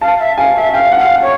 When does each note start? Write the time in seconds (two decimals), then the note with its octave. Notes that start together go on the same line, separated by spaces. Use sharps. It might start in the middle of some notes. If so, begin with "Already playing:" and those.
0.01 F5 A5
0.19 E5
0.37 F5 G#5
0.56 E5
0.74 F5 G5
0.92 F#5
0.99 F5
1.22 C#5